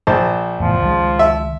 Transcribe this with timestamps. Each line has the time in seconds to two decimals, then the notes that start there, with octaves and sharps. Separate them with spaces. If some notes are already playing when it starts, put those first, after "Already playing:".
0.07 A#1 C5 A5
0.60 F1 E2 A2 F3
0.81 C#2 D#3 G#3
1.19 E5